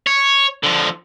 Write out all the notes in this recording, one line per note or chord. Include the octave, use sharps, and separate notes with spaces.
C#5
D3 F3